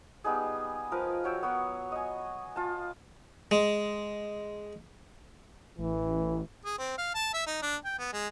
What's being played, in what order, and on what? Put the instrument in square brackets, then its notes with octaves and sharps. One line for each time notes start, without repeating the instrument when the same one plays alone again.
[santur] G3 B3 D#4 G#4
F3 A#4 B4 F5
F#3 C#5 G5 E6
B3 F#4 C#5 F#5
D#5 G#5
F4 A5
[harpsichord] G#3
[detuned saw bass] A1 [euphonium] E3
[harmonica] G#4
C4
F5
A5
E5
D#4
D4
G5
B3
G#3